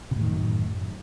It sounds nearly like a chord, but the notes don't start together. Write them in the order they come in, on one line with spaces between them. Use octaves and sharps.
C3 A2 D#3 F#2